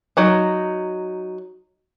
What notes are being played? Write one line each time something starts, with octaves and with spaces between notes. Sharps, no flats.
F#3 D#4